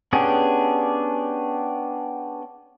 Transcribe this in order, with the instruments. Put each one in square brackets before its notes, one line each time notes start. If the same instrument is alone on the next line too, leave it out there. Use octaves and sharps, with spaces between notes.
[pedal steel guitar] B3 C#4 D4 G4 G#4